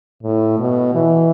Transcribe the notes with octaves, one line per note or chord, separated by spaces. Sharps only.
A2
B2
E3